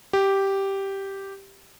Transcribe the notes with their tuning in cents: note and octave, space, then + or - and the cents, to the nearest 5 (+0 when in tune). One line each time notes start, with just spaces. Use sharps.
G4 -5